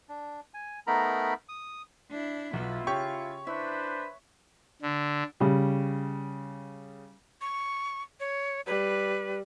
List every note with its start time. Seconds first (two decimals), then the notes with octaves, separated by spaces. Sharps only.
0.09 D4
0.54 G#5
0.87 A3 B3 D#4 A#4 A#5 B5
1.49 D#6
2.10 D4 E4
2.53 B1 B3 E4 F4
2.87 C#3 G4 C#5 C#6
3.47 D4 E4 B4 C5 E5
4.82 D3
5.40 C#3 G3
7.41 C#6
8.20 C#5
8.67 G3 B4